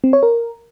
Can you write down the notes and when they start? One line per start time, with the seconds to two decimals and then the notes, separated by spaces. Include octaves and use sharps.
0.04 C4
0.13 C#5
0.23 A#4